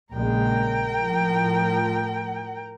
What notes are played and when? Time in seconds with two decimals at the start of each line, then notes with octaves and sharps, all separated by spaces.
0.13 A#1 C#3 G#3 A#4 G5
1.00 A2 F3